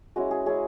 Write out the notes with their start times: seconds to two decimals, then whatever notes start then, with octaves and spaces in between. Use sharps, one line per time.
0.16 G#3 C#4 E4 F#4
0.31 G#4
0.46 G#3 C#4 E4 G#4